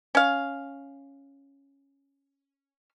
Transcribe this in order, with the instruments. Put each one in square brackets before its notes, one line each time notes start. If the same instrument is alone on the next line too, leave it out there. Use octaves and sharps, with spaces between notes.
[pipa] C#4 F5